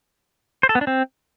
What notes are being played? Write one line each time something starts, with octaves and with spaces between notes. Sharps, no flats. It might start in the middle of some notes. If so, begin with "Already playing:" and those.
C5
A4
B3
D4
C4